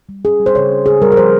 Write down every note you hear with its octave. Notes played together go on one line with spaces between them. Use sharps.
G3
C#4 G#4
G3
C5
C#3 C#5
C#4
C#3 G#4
G3 A#4
A#4
F3 C5